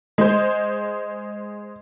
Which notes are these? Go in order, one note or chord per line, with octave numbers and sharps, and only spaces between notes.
G#3 C5